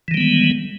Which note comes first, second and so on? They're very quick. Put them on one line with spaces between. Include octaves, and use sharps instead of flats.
E3 D#3 G3 B3 G#3